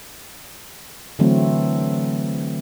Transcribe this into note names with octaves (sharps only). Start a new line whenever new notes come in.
D3 E3 F#3 A3 C4